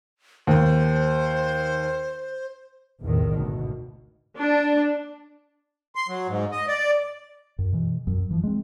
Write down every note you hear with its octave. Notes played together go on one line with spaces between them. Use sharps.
D#2 C5
B1 E2 A2 C3 D#3
G#1 D2 B2
D4
C6
F#3
G#2
D#5
D5
F#2
B2 E3
F#2 F#3
E3 F3
G#3 C4